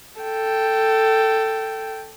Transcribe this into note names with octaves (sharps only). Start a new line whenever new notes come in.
A4 G5